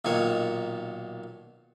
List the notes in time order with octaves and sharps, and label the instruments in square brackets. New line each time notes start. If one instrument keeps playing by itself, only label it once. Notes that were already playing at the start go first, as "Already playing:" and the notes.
[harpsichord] B1 A#2 D#3 C#5